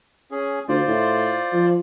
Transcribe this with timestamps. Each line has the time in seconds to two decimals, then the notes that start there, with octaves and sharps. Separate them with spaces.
0.31 C#4 G#4
0.68 D2 F4 C5 D5
0.88 A2
1.53 F3